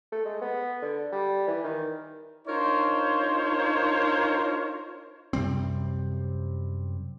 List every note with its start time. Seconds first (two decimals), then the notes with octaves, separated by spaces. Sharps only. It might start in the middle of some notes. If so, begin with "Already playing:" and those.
0.12 A3
0.26 G#3
0.41 B3
0.82 D3
1.12 G3
1.48 E3
1.64 D#3
2.47 D4 D#4 F4 A#4 C5 C#5
5.33 F#2 C3 G3 C4